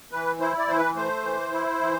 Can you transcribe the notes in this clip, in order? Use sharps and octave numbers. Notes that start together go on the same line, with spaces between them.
E3 B4
E4 C5
D5
E3 C5
B4
A3 C5
E3
E4
E3